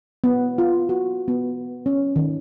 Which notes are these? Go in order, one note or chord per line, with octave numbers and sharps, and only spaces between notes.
B3
F4
F#4
B3
C#4
D#3